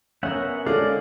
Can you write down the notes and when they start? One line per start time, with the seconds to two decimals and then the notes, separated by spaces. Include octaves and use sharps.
0.23 B3 C#4 A#4 E5 F#5
0.66 D3 G#3 D4 A4 D5 F5